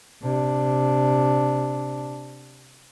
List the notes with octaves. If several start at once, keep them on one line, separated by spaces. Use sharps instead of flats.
C3 D4